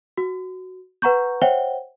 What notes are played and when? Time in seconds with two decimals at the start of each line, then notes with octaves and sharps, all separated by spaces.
0.17 F#4
1.02 B4 F#5 A#5 C#6 G6
1.42 C5 C#5 E5 F#5 G5 G7